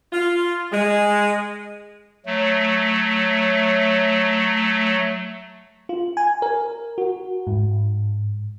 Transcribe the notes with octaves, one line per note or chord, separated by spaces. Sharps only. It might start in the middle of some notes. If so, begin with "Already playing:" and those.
F4
G#3
F#3 A3
F4
G#5
A#4
F#4
G#2